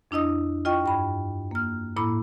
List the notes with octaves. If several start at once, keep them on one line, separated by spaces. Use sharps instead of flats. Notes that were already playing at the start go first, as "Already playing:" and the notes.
F2 D4 E4 D#5 D#6
F4 D#5 G5 C#6
G2 G5 B5
A#3 F6
A2 A#3 E4 B5 D6